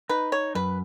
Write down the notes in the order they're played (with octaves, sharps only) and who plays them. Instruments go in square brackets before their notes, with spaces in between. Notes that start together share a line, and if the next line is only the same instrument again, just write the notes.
[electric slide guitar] D#4 [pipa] B4
[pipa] C#5
[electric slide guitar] F#2 [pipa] B4